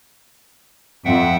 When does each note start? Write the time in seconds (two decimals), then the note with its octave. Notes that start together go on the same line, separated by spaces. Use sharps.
1.05 F2 E5 F#5 G5